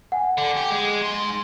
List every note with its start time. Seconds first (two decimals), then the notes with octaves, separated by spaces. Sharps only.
0.12 F#5 G#5
0.38 D3
0.57 G4
0.71 G#3
1.02 G#2 C6